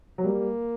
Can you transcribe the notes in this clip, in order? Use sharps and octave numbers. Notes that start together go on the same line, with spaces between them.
F#3
G3 A#3